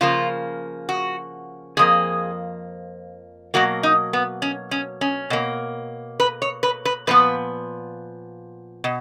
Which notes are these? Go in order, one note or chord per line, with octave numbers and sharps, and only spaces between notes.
C#3 F3 A#3 F4
F#4
F2 F3 A#3 G#4
B2 F#3 A#3 F#4
D#4
B3
C#4
C#4
C#4
B2 A#3
B4
C#5
B4
B4
A#2 F3 B3 B4
B2